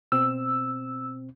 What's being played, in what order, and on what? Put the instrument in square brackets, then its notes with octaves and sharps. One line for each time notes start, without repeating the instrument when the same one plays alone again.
[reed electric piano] B2 C4 [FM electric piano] E6